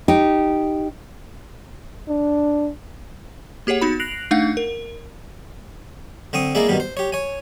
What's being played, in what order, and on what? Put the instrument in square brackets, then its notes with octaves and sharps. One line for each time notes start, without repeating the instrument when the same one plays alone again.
[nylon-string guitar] D#4 G4
[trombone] D4
[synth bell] A#3 G4 G#4 C#5 F#5
B3 D#4 F#4 B5
F#6 A#6 C7 D7 F7 F#7
A3 D4 D#4 F5 F#5
A#4
[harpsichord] D3 C4 C#6 D#6
G#3 A#3 E4 G#4 D5
G2 B2 D#3 G3
C5
G4 C#5
C#5 G#5